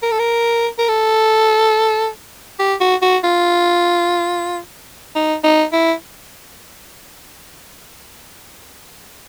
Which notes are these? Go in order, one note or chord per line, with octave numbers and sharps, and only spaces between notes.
A#4
A4
A#4
A#4
A4
G4
F#4
F#4
F4
D#4
D#4
E4